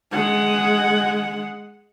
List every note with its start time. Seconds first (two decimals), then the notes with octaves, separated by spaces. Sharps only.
0.12 G#3 F#5